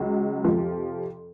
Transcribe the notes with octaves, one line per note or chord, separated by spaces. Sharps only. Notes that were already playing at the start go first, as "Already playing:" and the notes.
Already playing: C#2 C#3 F#3
F2 C3 F3